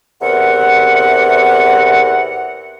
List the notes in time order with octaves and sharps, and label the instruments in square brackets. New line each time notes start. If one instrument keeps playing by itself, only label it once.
[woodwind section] E2 C3 A#4 F#5